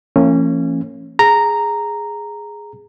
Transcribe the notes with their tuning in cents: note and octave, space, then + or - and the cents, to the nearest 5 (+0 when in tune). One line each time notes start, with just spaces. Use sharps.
E3 +45 A#3 -40 C#4 -20
G#4 +0 A#5 -5